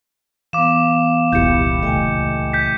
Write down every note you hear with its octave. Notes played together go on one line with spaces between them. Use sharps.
E3 B3 F5 D6 E7
E1 C2 A#2 E4 G4 G6 C#7
C#2 A3 D#5 G5 G#5
G6 B6